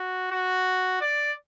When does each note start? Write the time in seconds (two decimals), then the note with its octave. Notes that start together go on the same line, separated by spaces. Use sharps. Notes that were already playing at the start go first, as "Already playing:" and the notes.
Already playing: F#4
0.31 F#4
1.01 D5